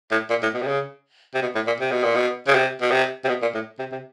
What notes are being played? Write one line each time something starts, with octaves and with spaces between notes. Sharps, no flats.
A2
A#2
A2
B2
C3
C#3
C3
B2
A2
A#2
C3
B2
A#2
B2
C#3
C3
B2
C3
C3
B2
A#2
A2
C3
C3